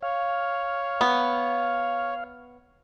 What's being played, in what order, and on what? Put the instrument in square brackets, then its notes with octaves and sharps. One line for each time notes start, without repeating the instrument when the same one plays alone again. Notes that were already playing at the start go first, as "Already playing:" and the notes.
[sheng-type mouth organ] C#5 [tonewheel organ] F5
[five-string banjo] B3